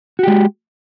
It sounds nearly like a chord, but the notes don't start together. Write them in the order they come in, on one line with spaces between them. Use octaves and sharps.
F#4 G4 G#3